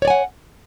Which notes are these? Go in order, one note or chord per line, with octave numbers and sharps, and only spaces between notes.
C#5 D5 F#5 G#5